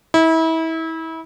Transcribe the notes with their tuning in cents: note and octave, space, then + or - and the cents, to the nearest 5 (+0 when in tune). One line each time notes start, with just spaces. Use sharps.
E4 -30